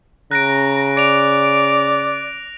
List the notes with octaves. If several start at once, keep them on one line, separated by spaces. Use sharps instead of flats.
C#3 A#5 F#6 A#6 D7
D5 D7 F7